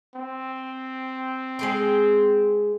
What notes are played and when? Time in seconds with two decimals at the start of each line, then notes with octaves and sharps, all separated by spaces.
0.15 C4
1.59 G#3 G#4 G5